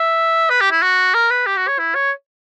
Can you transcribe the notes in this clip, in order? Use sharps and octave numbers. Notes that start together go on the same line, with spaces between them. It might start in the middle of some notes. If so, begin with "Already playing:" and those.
Already playing: E5
B4
G4
E4
F#4
A#4
B4
G4
F#4
C#5
E4
C#5